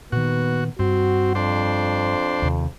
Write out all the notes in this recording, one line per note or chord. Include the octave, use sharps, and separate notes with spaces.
A#2 D#3 B3 F#4
G2 C4 F#4
F2 D4 C5
D#2 C3